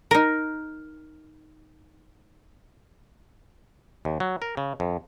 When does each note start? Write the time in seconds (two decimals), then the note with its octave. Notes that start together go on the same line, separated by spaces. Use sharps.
0.11 D#4 A#4
4.05 D#2
4.20 F#3
4.42 A#4
4.57 C#3
4.80 F2